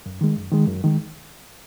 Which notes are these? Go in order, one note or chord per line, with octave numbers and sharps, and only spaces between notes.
F#2
D#3 G#3
F#2
D#3 G#3
F#2
D#3 G#3